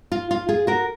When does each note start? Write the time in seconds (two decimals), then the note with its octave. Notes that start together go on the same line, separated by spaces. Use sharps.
0.12 F4
0.31 F4
0.49 F4 G#4
0.67 F#4 A#4